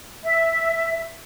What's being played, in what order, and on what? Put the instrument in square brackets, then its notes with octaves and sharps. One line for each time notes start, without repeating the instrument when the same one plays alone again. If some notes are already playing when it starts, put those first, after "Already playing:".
[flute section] E5